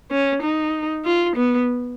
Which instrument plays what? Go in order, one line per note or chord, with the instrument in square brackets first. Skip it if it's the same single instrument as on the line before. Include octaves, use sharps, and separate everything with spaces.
[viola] C#4
D#4
F4
B3